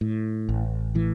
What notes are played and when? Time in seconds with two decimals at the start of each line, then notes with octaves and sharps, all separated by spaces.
0.01 A2
0.49 A1
0.95 A2 E3